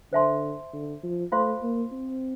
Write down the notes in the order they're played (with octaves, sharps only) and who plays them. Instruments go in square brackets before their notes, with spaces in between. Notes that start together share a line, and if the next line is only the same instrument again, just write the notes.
[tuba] D3 [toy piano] C5 E5 A5 C6
[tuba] D3
F3
[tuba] A3 [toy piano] F4 C5 F5 C6
[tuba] A#3
C4